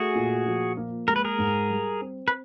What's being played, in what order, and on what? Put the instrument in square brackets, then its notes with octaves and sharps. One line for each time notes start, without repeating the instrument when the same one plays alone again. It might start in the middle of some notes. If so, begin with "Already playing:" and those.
Already playing: [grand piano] A3 [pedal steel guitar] F#4 G#4
[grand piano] A#2
F3
A#3
[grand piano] G#3 [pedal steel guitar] A#4
[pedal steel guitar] B4
G#4 A#4
[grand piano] G#2
G3
C4
[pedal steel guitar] B4